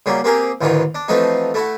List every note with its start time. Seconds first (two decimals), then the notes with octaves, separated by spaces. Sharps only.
0.06 C#3 F#3 G3 A#3
0.24 A#3 C4 G4 G#4 A#4
0.61 A1 D2 D#3 E3 F4 F#4
0.95 D4
1.08 E3 F3 A3 C4 D#4 F#4
1.54 A3 E4 F#4